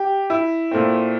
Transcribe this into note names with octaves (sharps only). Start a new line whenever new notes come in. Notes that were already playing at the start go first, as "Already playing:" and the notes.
Already playing: G4
E4
A#2 A3 C4